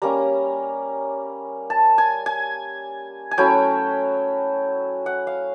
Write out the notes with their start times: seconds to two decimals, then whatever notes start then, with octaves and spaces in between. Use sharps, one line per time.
0.02 G3 A#3 C#4 A#5
1.70 A5
1.98 G#5
2.26 G#5
3.31 G#5
3.38 F#3 A3 C#4 E4 G5
5.06 F#5
5.27 F5